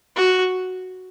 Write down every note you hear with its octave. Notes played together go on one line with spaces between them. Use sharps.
F#4